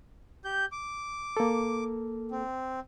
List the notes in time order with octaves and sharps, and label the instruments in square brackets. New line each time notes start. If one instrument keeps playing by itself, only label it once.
[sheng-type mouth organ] G4 G6
D6
[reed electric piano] A#3 A4
[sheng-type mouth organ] C4